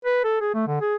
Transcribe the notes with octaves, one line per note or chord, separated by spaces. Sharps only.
B4
A4
G#4
A3
D3
G#4